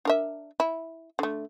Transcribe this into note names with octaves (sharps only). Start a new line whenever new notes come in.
D4 A#4 E5
E4
D3 A3